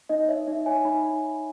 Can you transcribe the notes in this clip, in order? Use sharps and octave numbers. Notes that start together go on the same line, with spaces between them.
D#4 D#5
C#5 E5
D#4 E5
C#5 G#5
D#4 B5